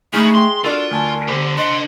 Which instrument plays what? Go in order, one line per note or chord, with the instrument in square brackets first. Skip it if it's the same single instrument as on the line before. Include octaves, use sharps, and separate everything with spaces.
[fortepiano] G#3 D#4 [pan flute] A3 [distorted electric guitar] C#4 B5
[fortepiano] G#3 G5 [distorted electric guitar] C6
[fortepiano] D4 F#4 A4 [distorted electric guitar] F4 [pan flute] A#4
[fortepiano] D2 G#5 A5
[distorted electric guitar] D3 G4 [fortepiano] C5
[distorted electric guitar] D4 C6 [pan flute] D#5